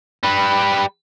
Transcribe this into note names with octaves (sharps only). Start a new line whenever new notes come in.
G3 B4